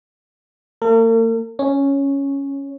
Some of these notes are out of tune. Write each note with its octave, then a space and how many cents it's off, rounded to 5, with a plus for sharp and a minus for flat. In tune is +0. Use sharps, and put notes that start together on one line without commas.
A#3 -45 A#4 -45
C#4 +0 C#5 +0